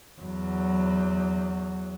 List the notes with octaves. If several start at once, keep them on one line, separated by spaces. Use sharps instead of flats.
E2 F#3